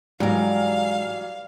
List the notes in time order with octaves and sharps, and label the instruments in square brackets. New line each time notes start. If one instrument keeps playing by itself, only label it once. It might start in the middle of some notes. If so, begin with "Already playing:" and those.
[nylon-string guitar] G#2 [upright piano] E3 F#3 [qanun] G3 A#4 [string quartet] F5